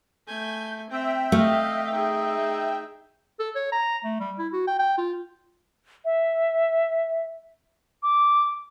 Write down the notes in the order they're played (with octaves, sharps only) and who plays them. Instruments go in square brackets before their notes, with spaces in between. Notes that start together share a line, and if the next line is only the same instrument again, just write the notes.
[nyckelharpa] A3 G#5 [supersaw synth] G6
[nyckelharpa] C4 [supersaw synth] E5 G5
[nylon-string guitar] A3 [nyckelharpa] D#5 F5
[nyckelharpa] D#4 G#4
[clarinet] A4
C#5
A#5
A3
G3
E4
F#4
G5
G5
F4
[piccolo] E5
D6